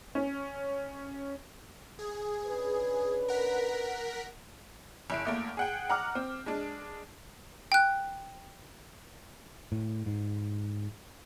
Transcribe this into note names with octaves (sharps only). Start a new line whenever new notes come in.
C#4
G#4
C#4 D4 B4
A#4 F#5 B6
F#1 E4 D7
E2 A3 A#3
G#4 F#5 G5
F#5 A#5 D6 F6
C4
G#3 D4
G5 F#6
A2
G#2